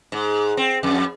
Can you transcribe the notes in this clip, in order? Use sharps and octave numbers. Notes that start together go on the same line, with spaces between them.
G#2
C4
F2